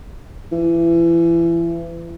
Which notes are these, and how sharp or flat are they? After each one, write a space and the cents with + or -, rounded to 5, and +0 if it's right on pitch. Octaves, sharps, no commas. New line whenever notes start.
E3 +30